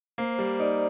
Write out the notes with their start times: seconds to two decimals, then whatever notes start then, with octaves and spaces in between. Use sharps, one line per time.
0.18 A#3 C5
0.39 G3
0.60 D#4 D5